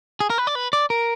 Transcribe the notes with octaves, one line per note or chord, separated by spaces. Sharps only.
G#4
A#4
B4
D5
B4
D5
A#4